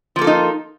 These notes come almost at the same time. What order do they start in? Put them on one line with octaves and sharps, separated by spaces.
F3 A#3 A4 F4 D#4